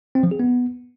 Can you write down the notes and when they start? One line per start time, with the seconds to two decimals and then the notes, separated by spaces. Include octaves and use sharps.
0.15 C4
0.23 F3
0.31 G#4
0.39 B3